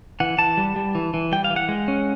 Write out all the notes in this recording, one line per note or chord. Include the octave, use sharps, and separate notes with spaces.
E3 F#5
E3 A5
G3
G3
E3
E3
G3 G5
F5
E3
F#5
G#3
C#4